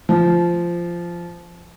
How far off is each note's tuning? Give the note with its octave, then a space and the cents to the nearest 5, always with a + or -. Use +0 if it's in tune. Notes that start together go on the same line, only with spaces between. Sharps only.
F3 -15